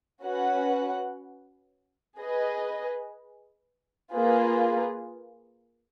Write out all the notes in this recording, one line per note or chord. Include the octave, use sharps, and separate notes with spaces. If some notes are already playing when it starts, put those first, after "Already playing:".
C#4 F#4 B4 F#5
G#4 B4 D#5
A#3 F4 G#4 B4